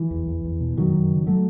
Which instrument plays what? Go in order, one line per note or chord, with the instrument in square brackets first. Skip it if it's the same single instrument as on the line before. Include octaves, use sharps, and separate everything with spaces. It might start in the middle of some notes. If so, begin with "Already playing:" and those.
Already playing: [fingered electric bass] E3
E2
E2
E2
B2
F#2 D#3 F#3
F#2
C#3
F#3 A3